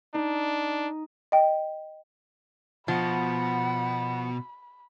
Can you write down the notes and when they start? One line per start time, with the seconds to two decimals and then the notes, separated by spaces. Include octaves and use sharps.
0.14 D4 D#4
1.32 D#5 G5
2.88 B2 F3 F#5 B5